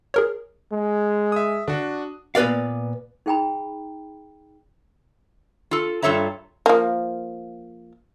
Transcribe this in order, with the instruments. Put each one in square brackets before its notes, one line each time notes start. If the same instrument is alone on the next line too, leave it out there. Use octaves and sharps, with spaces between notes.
[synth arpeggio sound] G#4 A#4 C#5
[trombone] G#3
[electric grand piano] E5 D#6
[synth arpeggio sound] D3 [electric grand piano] D4 F#4
[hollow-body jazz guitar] A#2 B3 B4 D5 F5
[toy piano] D#4 G#4 G5 G#5 A#5 B5
[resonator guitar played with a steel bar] F4 A4
G2 F4 A4 C#5 E5 A#5
[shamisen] F3 A#3